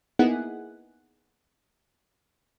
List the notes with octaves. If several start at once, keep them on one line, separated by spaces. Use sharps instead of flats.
A#3 B3 D#4 E4 G#4 F#5